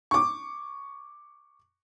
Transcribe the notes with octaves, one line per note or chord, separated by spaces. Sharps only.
C#6 D6